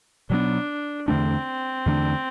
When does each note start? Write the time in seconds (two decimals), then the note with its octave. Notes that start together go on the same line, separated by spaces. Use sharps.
0.29 B2 F#3 B3 D4
1.08 E2 D3 A3 C4 D4
1.86 E2 D3 A3 D4